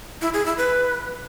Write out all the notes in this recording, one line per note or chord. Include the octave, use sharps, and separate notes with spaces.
E4
G#4
E4
B4